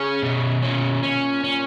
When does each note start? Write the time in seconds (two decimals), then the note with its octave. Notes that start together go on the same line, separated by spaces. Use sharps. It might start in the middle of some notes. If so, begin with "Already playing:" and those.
Already playing: C#3 C#4
0.22 B2
0.62 A#2 C#4
1.03 C#4
1.44 C#4